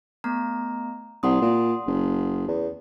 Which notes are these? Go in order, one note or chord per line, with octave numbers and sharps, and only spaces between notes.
A3 B3 A#5
C2 F#5 C6 D#6
A#2
F#1
E2